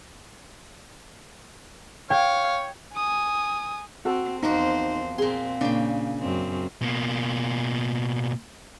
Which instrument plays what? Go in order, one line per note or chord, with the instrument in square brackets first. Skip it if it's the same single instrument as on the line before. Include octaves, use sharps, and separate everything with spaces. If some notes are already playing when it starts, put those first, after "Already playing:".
[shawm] C#5 [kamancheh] F5 [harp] G5
[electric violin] G#5 D#6
[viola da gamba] C4 [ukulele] F#4 A4 A5
[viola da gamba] E2 C4 C5 [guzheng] F3 A#3 F#4 [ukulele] D#4
[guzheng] A#2 C6 [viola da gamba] C4 [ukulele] G#4
[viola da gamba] A#2 A#3 [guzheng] C#3 G5 [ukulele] D4
[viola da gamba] F#2 C4
[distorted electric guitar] B2 A#3